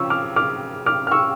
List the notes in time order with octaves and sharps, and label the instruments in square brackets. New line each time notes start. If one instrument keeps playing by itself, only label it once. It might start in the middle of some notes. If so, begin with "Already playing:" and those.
Already playing: [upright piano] C#3 F3 C#6 E6
D6 F6
D6 F6
D6 F6
F6
C#6 E6